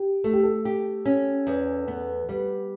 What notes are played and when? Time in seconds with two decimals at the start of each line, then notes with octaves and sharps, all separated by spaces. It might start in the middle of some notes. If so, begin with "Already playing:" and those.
Already playing: G4
0.24 A3 A4
0.33 G4
0.43 A4
0.65 G4
1.06 C#4
1.47 E2
1.88 B3
2.29 G3 B4